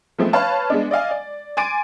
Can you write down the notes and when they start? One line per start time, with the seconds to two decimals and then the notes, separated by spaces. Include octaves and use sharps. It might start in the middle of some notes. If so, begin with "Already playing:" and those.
0.18 F3 G#3 A3 B3 C4
0.33 B4 C#5 F5 A5
0.70 G#3 B3 D4
0.91 D5 D#5 F5 G#5
1.11 D5
1.57 G#5 C6 D6 A6 D7 D#7